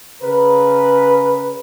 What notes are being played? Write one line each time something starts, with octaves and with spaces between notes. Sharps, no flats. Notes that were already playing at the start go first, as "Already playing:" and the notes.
C#3 A#4 B4